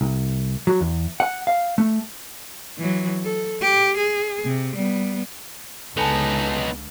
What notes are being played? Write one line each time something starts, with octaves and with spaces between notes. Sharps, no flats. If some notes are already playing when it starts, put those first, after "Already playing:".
C2
F#3
E2
F#5
F5
A3
E3 F#3
A4
G4
G#4
C3
G3 B3
C#2 D3 B3 D#4 A4 G#5 A5